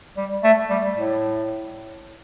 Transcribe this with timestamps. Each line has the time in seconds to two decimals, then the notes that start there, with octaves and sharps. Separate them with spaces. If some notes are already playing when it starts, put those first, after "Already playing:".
0.17 G3
0.44 A3
0.70 G3
0.95 A2